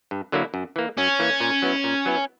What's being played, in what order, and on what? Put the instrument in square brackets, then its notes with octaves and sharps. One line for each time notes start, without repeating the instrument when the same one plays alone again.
[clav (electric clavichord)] G2
D3 F#3 A#3 E4
F#2
E3 A#3
[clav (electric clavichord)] F#2 [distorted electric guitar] C#4
[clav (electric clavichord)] E3 A#3
A#2
F#3 B3 E4
A#2
F#3 B3 E4